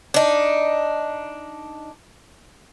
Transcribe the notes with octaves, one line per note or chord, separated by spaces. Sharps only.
D4 D#4